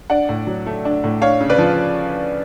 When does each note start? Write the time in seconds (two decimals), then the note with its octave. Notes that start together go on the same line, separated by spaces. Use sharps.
0.10 D4 D5 F#5
0.29 A2
0.47 F#3
0.66 A3
0.85 D4
1.04 A2
1.21 D4 C#5 F5
1.41 C#3
1.50 B4 D5
1.58 F3